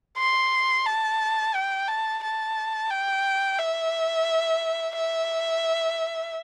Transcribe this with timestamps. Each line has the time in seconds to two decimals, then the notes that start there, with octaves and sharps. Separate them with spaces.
0.18 C6
0.86 A5
1.54 G5
1.88 A5
2.23 A5
2.91 G5
3.59 E5
4.95 E5